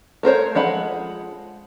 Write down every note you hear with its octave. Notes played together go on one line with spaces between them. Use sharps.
A3 A#4 C5 C#5
F3 G#3 F#5 B5